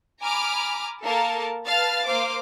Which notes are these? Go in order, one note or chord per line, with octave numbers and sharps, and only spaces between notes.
G#5 A#5 B5 D6 F6
A#3 A4 A#4 A5
B4 F5 A5 F6 A6
A#3 C5 F5 D6